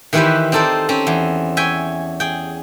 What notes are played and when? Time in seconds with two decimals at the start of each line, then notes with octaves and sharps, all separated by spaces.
0.13 D#3 E3 E4 G4 B4 C5
0.52 C4 D#4 A4 C5 D5
0.89 C4 C#4
1.07 E2
1.57 C#5 E5 G5 G#5
2.20 G#4 G5